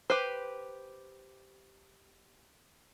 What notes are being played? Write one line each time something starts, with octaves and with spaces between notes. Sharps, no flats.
G4 B4 C5